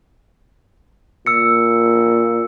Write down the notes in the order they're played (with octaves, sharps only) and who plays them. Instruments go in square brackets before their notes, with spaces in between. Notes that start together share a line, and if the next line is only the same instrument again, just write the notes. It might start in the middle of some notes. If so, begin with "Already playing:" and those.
[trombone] A#2 [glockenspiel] E6 C#7